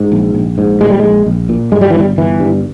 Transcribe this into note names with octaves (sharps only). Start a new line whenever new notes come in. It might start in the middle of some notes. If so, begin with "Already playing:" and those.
Already playing: G#2
A#1
A#1
G#2
A#2 G#3
G3
A#1 G#3
A#1
A#2
G2 G#3
G3
E3
G1
G3
G1 E3
G2